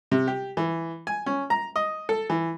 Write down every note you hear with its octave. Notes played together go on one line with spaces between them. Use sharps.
C3
G4
E3
G#5
C#4
A#5
D#5
A4
E3